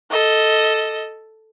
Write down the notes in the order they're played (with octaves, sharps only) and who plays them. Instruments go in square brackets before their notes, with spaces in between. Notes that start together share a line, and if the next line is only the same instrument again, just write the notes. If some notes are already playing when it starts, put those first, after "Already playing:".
[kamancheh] A4 D#5